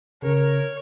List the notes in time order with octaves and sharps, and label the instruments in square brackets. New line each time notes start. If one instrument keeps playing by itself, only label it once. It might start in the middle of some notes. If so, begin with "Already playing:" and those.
[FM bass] C#3 [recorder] A#4 [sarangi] C#5